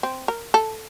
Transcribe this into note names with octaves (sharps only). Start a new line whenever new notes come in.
C4
A#4
A4